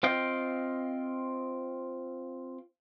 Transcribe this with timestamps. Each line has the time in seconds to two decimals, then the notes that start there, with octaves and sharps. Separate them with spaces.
0.03 C4 F4 D#5 F5 G5